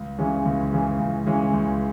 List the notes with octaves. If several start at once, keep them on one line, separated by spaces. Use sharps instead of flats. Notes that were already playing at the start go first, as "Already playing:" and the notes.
Already playing: C#2
C#3 E3 G#3 C#4
C#2
C#3 E3 G#3 C#4
C#2
C#3 E3 G#3 C#4
C#2